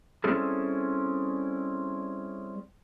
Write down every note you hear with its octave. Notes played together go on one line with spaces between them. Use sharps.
G3 C4 C#4 E4 G#4 A4